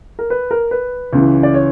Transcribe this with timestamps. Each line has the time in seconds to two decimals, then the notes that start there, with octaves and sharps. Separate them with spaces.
0.19 A#4
0.30 B4
0.51 A#4
0.71 B4
1.13 C#2 C#3 E3
1.43 D5
1.54 C#5